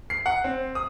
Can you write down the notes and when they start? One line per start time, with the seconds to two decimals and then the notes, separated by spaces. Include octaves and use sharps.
0.10 C7
0.26 F#5
0.44 C4
0.75 D#6